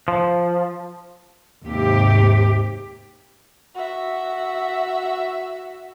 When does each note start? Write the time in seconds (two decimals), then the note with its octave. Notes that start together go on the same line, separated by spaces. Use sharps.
0.08 F3
1.66 D#2 G#2 C3 G4
3.75 F#4 E5